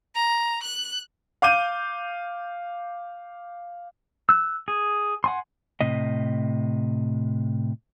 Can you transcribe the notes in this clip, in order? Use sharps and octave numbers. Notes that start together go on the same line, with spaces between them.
A#5
F#6
F5 D6 G6 D#7
E6 F#6
G#4
F#5 G#5 C6
A2 C3 D#5